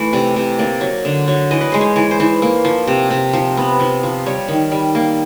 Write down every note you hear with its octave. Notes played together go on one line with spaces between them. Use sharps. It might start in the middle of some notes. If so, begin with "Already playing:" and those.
Already playing: E3 A3
C3 D5
C3
A#3 D5
F#3
D3
F#3
E3 D#5
B4
G#3 C5
C#5
E3
C5
E3
A#3
F3
C3
C3
F3
B3
F3
F3
G3 C#5
D#3
G3
A#3